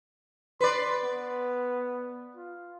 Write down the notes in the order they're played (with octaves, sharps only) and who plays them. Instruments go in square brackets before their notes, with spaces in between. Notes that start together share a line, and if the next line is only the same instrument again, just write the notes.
[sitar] B4 D5 [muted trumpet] C6
[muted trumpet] B3
F4